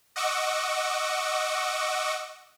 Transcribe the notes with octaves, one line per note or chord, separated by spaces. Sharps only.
D#5 F#5 C#6 D6 E6